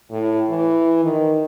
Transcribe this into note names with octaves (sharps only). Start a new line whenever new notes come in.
A2
E3
D#3